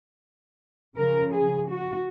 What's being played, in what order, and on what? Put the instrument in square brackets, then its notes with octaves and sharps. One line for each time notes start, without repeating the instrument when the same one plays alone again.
[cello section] C#3 F3 A#4
G#4
F#4